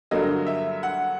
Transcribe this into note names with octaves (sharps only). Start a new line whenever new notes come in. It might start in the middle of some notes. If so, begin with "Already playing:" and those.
G2 D3 F#3 A#3 D#5
E5
F#5